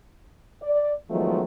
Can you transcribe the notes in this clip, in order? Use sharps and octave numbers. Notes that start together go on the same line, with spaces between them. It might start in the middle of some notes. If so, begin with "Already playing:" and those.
D5
D#3 F3 F#3 G#3 A3 B3